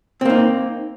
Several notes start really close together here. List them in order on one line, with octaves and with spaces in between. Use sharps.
C4 A#3 D#4